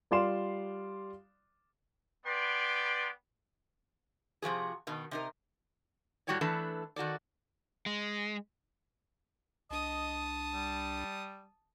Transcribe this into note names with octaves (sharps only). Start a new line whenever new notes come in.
G3 F4 D5 F5 C6 E7
B3 B4 D5 G5 C6
C3 F3 F#4 G#4
B2 D#3
C3 D#4 A#4
A2 G3 F#4 G4 C#5 D5
E3 A3 D4 A4 B4
D#3 F#4 A4 D5
G#3
C2 D4 D#5 A5 D#6
G3